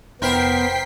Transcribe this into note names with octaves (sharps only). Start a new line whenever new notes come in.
F1 B3 E4 A#4 C5 G5 B6 C7